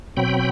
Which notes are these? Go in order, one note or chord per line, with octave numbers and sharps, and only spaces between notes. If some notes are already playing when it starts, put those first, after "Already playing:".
B2 F#3 C4 G5 B5